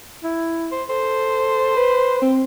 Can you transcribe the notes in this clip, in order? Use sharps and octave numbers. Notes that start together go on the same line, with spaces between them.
E4
C5
A4 C5
B4
C4